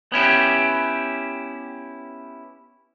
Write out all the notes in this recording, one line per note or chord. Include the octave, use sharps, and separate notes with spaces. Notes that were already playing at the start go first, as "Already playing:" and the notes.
B3 C#4 E4 G4